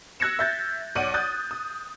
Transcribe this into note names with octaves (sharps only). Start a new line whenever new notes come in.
E6 F#6 G#6 A#6 C#7 E7
E5 G6 A6
B1 D5 F#5 D6 D#7 F#7
D#6 F#6 G6 A6
D#6